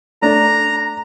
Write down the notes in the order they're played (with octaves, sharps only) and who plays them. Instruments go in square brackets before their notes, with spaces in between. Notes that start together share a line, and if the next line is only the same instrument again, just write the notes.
[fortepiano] A3 D4 [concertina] A#5